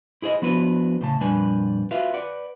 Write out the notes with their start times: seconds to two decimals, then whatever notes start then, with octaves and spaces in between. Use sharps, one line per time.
0.22 E4 G#4 C5 D5 D#5
0.42 F3 B3 D4 E4 F#4 B4
1.01 A2 C#3 A5
1.20 F2 A#2 G3 D4 B4 G#5
1.91 F4 F#4 B4 E5 F5
2.14 B4 D5 F#5